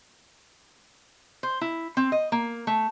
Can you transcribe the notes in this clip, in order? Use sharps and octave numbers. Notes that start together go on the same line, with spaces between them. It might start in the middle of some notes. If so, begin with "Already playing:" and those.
C5
E4
C4
D#5
A#3
A3